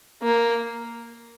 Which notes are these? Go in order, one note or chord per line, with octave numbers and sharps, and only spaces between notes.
A#3